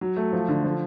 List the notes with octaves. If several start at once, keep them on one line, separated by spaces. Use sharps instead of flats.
F#3
A3
F3
D3
F3